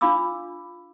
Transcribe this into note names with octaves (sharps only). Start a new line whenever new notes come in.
D4 F4 F5 B5 D6 E6